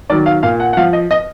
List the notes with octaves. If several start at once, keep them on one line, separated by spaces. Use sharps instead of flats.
D#3 F#3 D5
F5
A#2 F5
F#5
F#5
F3 F5
D#5
D#5